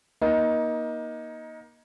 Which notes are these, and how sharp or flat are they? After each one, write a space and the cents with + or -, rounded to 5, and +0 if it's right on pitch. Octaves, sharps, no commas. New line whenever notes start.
A#3 +30 D#4 +15